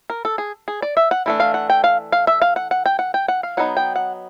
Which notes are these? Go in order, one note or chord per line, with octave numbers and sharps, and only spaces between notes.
A#4
A4
G#4
G#4
D5
E5
F#5
E3 A3 D4
F5
F#5
G5
F5
F5
E5
F5
F#5
F#5
G5
F#5
G5
F#5
F5
F#3 B3 D#4 F#5
G5
F#5